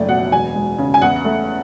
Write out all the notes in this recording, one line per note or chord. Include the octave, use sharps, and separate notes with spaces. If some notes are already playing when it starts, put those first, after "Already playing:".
Already playing: F#1 A3 D5
B2 F#5
E1 G#5
G#3
C#3
G#5
E2 F#5
A3